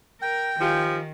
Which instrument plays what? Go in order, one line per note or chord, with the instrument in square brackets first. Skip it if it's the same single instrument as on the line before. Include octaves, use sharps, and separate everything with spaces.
[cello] A#4 [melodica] G5
[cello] D#3 [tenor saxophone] F3 [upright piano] F4 G4 G#5